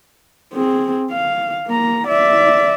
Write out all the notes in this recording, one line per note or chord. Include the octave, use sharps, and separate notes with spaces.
C4 G#4
F5
A#3 A#5
D5 E5